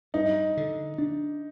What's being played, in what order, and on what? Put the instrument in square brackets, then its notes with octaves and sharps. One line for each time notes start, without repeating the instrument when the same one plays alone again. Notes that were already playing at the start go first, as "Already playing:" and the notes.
[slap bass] G2 [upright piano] D#4
[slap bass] D3
D4